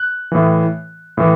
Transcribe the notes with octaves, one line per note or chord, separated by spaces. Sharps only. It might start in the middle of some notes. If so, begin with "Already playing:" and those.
Already playing: F#6
A2 E3
A2 E3